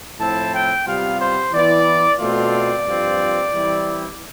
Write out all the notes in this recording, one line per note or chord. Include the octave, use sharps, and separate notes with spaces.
A2 F3 C4 E4 A5
G5
C3 G3 B3 F4 F5
C5
E3 B3 E4 D5
B2 A3 C4 F4 D5
G2 F3 C4 F4
E3 G3 C4 E4